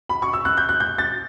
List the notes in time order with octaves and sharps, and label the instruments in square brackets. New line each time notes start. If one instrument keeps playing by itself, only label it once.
[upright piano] B5
C#6
E6
F#6
G6
F#6
G6
A6